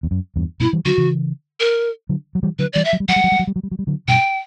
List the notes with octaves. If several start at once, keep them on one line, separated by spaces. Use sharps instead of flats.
E2
F#2
E2 G2
G2 B2 E4
E3 G3
D3 F#3 F#4
C#3 E3
A#4
D3 F#3
F#3
E3 G3
D3 F#3 B4
E3 G3 D5
E5
F#3
G3
F#3 F#5
G3
F#3
G3
F#3
G3
F#3
G3
F#3
G3
D3 F#3
G2 B2 G5